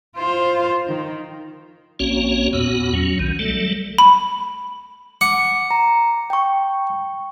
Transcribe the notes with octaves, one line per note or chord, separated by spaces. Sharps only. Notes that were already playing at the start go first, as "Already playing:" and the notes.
F4 C5
D#3
A#1 A#3 C4 C#4 F#4 C#5
E2 A#2 B3 F#4
F#3 C#4
B1 D#3
F#3 G3 A3 A4
B5
F#5 D6
A#5
G5 C#6